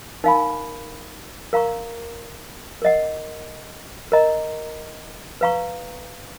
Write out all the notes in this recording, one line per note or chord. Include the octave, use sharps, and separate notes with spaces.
D#4 A#4 F5 G#5 B5
A#4 F5 A#5 C#6
A#4 D#5 F#5
A#4 D#5 A#5
B4 F5 A#5 C#6